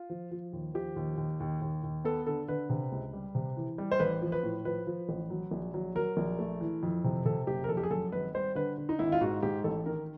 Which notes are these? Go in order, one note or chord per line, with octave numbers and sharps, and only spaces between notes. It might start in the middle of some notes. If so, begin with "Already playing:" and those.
Already playing: F4
F3
F3
D#2
F3 G4
D#2
D#2
D#2
D#2
D#2
B3 A4
D3 A4
D3 B4
C3
C#2
G3
C3
E3
G3
C5
A1 B4
F3
B4
A2
F3 B4
F3
A1
F#3
A#1
F#3
F#3 A#4
A#1
A3
E3
F2
C3
C3 A4
F#1 G4
A#4
F2 A4
G4
G#4
F#2 A4
G#1 B4
G3 C5
D3 B4
D3
D#4
G#1 E4
F4
G#2 F#4
G#2 G4
A1 A4
D#3 A#4